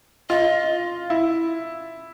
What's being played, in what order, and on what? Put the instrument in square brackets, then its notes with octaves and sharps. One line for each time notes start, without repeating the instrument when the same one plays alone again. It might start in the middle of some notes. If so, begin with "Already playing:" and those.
[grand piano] F4 [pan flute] D#5
[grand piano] E4